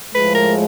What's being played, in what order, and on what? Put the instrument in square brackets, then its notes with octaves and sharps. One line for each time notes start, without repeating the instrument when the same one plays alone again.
[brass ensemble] A2 F3 G#3 [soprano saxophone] B4
[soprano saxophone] A#4